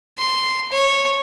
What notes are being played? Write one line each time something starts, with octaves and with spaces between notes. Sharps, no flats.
C6
C#5